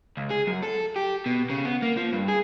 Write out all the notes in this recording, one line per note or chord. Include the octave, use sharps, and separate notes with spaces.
C#2
G#4
F#2
A4
G4
B2
C#3
B3
A#3
F3
G2
G#4